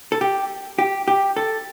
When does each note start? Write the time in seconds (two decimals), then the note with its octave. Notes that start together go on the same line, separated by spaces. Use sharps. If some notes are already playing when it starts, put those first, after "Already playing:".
0.12 A4
0.21 G4
0.79 G4
1.08 G4
1.37 A4